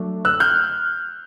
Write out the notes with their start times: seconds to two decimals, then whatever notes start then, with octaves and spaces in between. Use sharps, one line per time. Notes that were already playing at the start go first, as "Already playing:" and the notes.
Already playing: F#3 A3 D4
0.25 E6 F#6
0.40 F6 G6